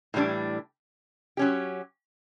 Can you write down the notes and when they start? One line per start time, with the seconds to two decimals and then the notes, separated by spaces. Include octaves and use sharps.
0.14 A2 E3 G3 D4
1.37 F#3 C#4 G4